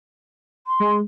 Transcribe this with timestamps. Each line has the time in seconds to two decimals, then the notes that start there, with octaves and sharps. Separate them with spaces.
0.67 C6
0.80 G#3